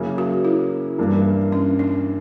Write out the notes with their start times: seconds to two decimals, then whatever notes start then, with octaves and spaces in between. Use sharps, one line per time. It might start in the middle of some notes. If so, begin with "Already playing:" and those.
Already playing: C#3 F#3 A#3 E4
0.18 F#4
0.45 E4
0.98 G2 E3 A#3 D4
1.52 C#4
1.79 D4